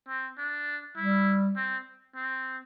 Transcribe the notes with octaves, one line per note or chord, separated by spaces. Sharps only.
C4
D4
G3 E4
C4
C4